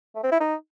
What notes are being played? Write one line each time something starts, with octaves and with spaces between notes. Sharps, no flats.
A3
C4
E4
D#4